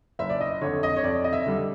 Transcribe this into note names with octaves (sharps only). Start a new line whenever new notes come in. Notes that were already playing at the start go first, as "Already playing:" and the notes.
F#1 E5
D5
D#5
F2 D3 C#5
D#5
C#5
F2 D5
D#5
E5
D3 G3